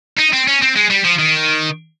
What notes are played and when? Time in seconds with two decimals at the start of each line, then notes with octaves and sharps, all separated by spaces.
0.19 D#4
0.33 C4
0.48 C#4
0.62 C4
0.76 G#3
0.90 G3
1.04 F3
1.19 D#3